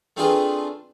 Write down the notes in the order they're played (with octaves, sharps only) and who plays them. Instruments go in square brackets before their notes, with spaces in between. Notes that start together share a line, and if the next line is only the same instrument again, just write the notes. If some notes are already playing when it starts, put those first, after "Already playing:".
[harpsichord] A3 C4 D4 F4 G#4 B4